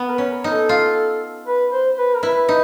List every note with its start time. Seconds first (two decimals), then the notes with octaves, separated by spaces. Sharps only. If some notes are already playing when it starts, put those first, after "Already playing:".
Already playing: B3
0.09 A#4
0.12 B4
0.18 C#4
0.31 A#4
0.44 D#4
0.51 A4
0.69 F4
1.47 B4
1.73 C5
1.98 B4
2.15 A#4
2.23 E4 B4
2.49 D#4